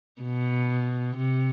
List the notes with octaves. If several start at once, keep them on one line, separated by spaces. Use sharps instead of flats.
B2
C3